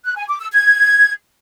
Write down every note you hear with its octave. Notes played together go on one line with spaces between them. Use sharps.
F#6
G#5
D6
E6
G#6